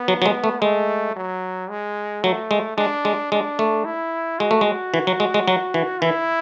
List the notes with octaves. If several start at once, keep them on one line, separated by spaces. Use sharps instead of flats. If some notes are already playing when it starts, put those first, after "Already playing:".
Already playing: B3
F#3
F#3
G#3
A3
G#3 A3
F#3
G#3
F#3 A3
G#3
G#3 D4
G#3
G#3 D4
A3
E4
G#3 F#4
A3
G#3
E3
F#3
G#3
G#3
F#3
E3
E3 E4